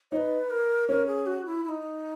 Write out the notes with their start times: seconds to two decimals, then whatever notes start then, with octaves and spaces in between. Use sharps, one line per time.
0.11 D#4 B4 C#5
0.50 A#4
0.88 C#4 A#4
1.07 G#4
1.26 F#4
1.46 E4
1.64 E4
1.69 D#4